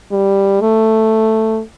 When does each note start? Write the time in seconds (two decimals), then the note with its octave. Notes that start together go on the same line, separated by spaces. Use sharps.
0.12 G3
0.61 A3